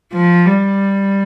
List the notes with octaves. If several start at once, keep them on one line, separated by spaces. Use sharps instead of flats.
F3
G3